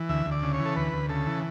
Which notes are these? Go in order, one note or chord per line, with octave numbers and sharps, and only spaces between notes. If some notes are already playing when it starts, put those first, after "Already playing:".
Already playing: E3
D2 E5
D2
D5
C#3
C#5
E3
A4
D2 B4
D2
C#3 A4
E3